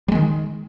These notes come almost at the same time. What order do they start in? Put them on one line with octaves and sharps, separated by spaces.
G3 G#3 D#3